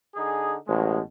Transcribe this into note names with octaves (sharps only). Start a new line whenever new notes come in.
D3 D#4 G#4
A1 B2 G#3